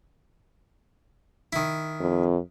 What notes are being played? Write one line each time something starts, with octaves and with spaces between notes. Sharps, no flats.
D#3 E4
F2